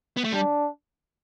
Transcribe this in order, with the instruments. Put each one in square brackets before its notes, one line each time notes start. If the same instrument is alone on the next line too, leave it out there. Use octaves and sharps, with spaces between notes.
[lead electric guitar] B3
A3
[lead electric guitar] G3 [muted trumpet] D4